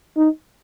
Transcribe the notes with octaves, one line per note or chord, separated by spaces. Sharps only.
D#4